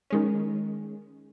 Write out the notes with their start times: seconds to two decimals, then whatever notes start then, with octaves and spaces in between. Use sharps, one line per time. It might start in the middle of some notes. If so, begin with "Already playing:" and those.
0.10 D#3 G#3 C#4